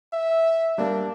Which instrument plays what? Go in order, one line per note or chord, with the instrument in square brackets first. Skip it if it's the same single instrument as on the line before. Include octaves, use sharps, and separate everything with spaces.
[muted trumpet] E5
[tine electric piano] G3 A#3 [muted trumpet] D4